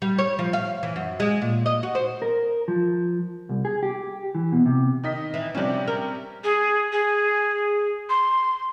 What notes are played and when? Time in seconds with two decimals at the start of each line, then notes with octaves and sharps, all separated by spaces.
0.02 G3
0.19 C#5
0.39 F3
0.53 F5
0.83 E3
0.96 F#2
1.20 G#3
1.42 A#2
1.66 D#5
1.83 F#4
1.95 C5
2.22 A#4
2.68 F3
3.49 C2
3.65 G#4
3.83 G4
4.35 E3
4.52 B2
4.66 C3
5.04 D#3 D#5 B6
5.34 E3
5.55 C3 F3 G3 C#4 D4
5.88 A#4
6.44 G#4
6.92 G#4
8.09 C6